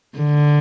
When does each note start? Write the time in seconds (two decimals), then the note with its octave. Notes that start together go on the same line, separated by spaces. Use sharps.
0.18 D3